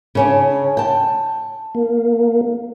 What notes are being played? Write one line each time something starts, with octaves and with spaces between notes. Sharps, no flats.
C#3 C#4 D4
G5 A5
A#3